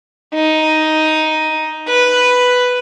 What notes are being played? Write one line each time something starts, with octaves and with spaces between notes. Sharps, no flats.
D#4
B4